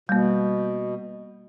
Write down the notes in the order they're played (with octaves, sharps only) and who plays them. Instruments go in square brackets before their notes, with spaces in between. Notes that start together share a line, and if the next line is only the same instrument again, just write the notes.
[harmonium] B2 [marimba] G3 A#3